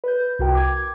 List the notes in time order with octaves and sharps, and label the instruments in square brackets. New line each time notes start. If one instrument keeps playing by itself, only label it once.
[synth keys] B4 G6
C2 F#4 A#4 G5
D6 G#6